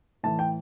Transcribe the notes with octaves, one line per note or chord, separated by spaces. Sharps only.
A2 E3 A5
G5